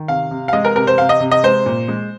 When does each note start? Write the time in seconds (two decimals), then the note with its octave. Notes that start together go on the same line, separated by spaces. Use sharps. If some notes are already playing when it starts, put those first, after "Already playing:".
Already playing: D#3
0.08 C3 F5
0.31 C3
0.48 F5
0.53 G#3 D#5
0.65 A#4
0.75 C3 A#4
0.87 C5
0.98 C3 F5
1.09 D#5
1.20 C3
1.31 D#5
1.43 G#3 C5
1.66 A#2
1.88 G#3